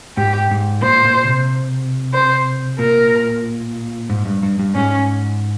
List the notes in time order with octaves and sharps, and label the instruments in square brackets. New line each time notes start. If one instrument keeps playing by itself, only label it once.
[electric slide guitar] G#2 [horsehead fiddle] G4
[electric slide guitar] G#2
[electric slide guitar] A#2 [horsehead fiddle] C5
[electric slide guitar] A#2
C3
[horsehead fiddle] C5
[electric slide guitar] A#2 [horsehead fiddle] A#4
[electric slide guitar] G#2
G2
G2
G2
[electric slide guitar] G#2 [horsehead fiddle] C#4